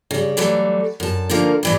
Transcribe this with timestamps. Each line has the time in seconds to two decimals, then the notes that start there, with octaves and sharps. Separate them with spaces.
0.11 C#3 G3
0.37 E3 F#3 G3 A3
1.00 F#2 A5
1.30 D3 D#3 F3 A#3 A#4
1.63 A2 E3 G3